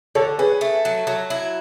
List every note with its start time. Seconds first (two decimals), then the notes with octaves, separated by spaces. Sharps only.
0.15 D3 A4 C#5
0.39 C#4 G#4 B4
0.61 A3
0.85 F#3
1.07 F#3
1.30 E4